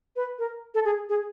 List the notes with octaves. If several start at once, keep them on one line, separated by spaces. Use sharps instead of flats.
B4
A#4
A4
G#4
G#4